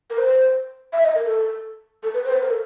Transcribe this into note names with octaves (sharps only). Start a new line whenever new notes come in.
A#4
C5
E5
D#5
A#4
A4
A4
B4
C5
B4
A#4
A4